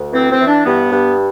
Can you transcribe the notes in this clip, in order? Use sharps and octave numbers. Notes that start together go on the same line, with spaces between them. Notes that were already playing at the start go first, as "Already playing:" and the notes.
Already playing: D2
E3 C4
C4
E3
D4
G2 B3
G2